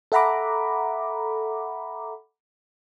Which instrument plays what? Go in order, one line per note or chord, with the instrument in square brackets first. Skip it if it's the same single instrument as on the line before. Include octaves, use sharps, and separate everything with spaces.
[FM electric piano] A4 E5 F#5 A#5 B5 D6